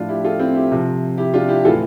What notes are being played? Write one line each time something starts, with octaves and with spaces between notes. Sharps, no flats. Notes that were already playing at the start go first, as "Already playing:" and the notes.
Already playing: A2 F3 D4 F4
E4 G4
F4 A4
C4 E4
E4 G4
C3 F3
E4 G4
D4 F4
E4 G4
A2 E3 F4 A4